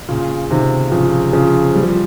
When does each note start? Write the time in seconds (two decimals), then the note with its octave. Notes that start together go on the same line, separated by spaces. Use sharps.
0.08 A#2 C#3
0.51 C3 D#3
0.92 C#3 F3
1.33 C#3 F3
1.75 G3
1.83 F3